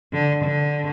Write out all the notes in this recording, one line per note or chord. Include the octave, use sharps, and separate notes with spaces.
D3
D3